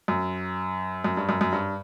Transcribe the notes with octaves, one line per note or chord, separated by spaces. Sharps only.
F#2
F#2
G2
F#2
F#2
G2